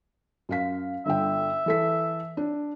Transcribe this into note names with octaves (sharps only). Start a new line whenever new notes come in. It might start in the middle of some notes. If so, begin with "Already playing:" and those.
F#2 F5 B6
G1 D3 E5 G5
E3 A4 B6
D4